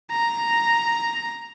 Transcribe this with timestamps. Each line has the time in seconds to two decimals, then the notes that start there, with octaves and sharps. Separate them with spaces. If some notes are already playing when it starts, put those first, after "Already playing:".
0.11 A#5